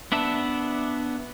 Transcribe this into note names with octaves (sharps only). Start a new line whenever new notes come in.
B3 D4 E5 A5